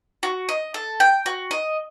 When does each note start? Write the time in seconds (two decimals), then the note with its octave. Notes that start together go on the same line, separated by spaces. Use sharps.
0.23 F#4
0.49 D#5
0.74 A4
1.00 G5
1.26 F#4
1.51 D#5